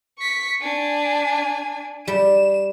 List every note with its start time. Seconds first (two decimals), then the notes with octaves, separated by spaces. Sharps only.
0.19 C#6 B6
0.62 D4 G#5
2.08 G3 E7